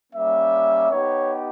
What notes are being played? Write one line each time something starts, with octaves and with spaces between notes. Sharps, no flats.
G3 A#3 C#4 E5
B3 D#4 G4 C#5